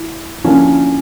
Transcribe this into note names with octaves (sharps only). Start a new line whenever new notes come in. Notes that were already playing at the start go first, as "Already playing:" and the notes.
Already playing: E4
D3 F3 A#3 C#4 E4